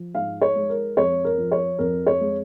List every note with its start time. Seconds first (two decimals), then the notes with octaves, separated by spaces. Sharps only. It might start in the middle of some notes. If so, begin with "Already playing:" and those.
Already playing: F3
0.15 G#2 F5
0.42 C#5
0.55 G#3
0.70 A#4
0.97 F2 C#5
1.25 A#4
1.38 F3
1.52 C#5
1.79 F2 A#4
2.07 C#5
2.21 G#3